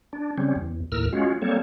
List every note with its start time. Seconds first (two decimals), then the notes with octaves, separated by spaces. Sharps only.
0.13 D4
0.38 C#3 G3 C4 C#4
0.56 E2
0.92 D#2 A2 A#4 E6 F6
1.13 G#3 C#4 F4 F#4
1.42 G3 A#3 C4 A4 C#5